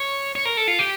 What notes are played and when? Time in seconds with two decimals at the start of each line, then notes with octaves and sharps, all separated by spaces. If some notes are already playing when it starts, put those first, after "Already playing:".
Already playing: C#5
0.35 C#5
0.45 A#4
0.57 A4
0.68 F4
0.79 G4